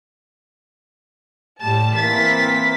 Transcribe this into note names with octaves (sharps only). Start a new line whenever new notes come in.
A2 G3 A5
E3 A#3 C4 E4 A6 B6